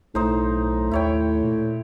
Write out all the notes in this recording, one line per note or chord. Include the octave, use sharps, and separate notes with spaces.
B1 A2 D#4 C5
D#2 E4 C#5 G5
A#2